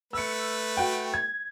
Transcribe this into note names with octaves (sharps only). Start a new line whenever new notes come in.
A3 B4 E6 C#7
F#4 G5
G#6